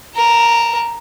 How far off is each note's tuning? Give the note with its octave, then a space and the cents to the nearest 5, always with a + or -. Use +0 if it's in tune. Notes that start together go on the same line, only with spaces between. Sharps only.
A#4 +0 A5 +40